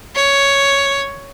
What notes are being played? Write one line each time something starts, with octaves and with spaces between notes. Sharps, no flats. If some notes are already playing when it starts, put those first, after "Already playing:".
C#5